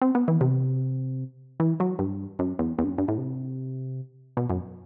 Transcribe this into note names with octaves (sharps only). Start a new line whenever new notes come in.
C4
B3
E3
C3
E3
F#3
G2
F#2
E2
E2
G2
F#2
G2
A2
C3
B2
F#2